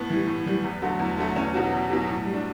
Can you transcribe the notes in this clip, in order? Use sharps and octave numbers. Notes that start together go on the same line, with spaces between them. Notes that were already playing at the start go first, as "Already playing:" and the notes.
Already playing: A2 B3
E3 G3
A2
E3 G3
E2
D3 F#3 A3
E2
D3 F#3 A3
E2 C#4
B2 F#3 F#4
E2
B2 F#3
A2
G3
D4